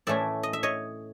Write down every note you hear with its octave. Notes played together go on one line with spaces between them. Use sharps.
A2 E3 A3 C#4 D5 E5
D#5
E5
C#5 D#5